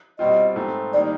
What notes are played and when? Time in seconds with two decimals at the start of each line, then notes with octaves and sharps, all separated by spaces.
0.19 B2 G3 C4 F4 D#5
0.56 G#2 E3 A3 C4
0.93 D#3 G3 A#3 D#4 D5